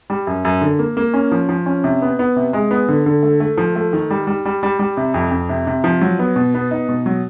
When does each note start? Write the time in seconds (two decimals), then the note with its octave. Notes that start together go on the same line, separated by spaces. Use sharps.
0.10 G3
0.27 F#2
0.45 F#2
0.61 D3
0.79 A#3
0.97 A#3
1.14 C#4
1.32 F3
1.49 F3
1.66 C#4
1.84 C3
2.02 B3
2.19 B3
2.36 C3
2.53 G#3
2.71 B3
2.88 D3
3.06 D3
3.23 A3
3.40 A3
3.58 F3
3.76 A3
3.93 D#3
4.11 G3
4.27 G3
4.45 G3
4.63 G3
4.79 G3
4.97 C3
5.14 F2
5.31 F2
5.49 C3
5.67 C3
5.84 F3
6.01 F#3
6.19 B3
6.36 B2
6.54 B3
6.71 D#4
6.89 B2
7.06 F#3